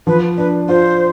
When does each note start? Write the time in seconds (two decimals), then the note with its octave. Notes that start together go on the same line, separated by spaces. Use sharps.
0.07 F3 B4
0.38 D4 B4
0.69 F4 C5